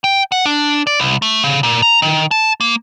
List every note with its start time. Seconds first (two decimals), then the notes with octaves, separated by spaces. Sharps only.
0.04 G5
0.32 F#5
0.46 D4
0.87 D5
1.00 C2
1.22 A3
1.44 C#3
1.63 A#2
1.82 A#5
2.02 D#3
2.31 A5
2.61 A#3